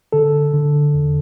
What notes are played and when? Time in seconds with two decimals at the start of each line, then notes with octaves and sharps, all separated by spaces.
0.12 D3 A4
0.54 D3
0.94 E2